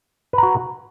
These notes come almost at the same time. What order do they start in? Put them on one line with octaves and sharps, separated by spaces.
B4 A#5 F#4